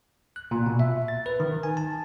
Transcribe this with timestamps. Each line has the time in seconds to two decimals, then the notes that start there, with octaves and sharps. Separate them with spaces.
0.36 F#6
0.51 A#2
0.66 B2
0.79 E5
1.08 A6
1.26 B4
1.40 D#3
1.63 G#5
1.77 A5